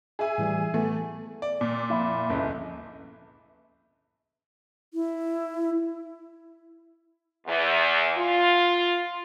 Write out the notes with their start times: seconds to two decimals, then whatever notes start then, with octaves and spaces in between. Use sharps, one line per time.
0.19 G#4 E5 G#5
0.38 A2 E3 G3
0.74 E3 A3 B3
1.42 D5
1.61 A#2
1.90 F2 E4
2.30 G1 C#2
4.94 E4
7.47 E2
8.18 F4